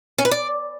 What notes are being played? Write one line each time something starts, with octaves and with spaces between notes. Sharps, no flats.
C#4
B4
D5